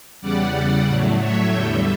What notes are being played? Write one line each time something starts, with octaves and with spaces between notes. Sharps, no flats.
E2 C#3 G3 D5 F#5
A2 F#3 A3
C#5 E5
E2 D3 G3 E5 G5